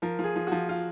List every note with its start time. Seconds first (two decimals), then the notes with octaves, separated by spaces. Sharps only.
0.02 F3 A#4
0.19 F3 G#4
0.36 F3
0.47 F3 F#4
0.69 F4